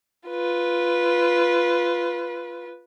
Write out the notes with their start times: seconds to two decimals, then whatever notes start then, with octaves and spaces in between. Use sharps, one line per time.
0.28 F4 B4